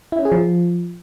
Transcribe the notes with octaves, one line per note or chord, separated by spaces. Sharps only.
E4
C#4
G#4
F3